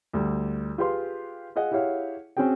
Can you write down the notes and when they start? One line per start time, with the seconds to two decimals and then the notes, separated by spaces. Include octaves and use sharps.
0.13 D2 G3
0.78 F4 G4 G#4 B4 F5 C6
1.56 F4 G#4 D#5 F#5
1.71 E4 G4 G#4 C#5 F5 F#5
2.37 C4 C#4 F#4 G#4 G5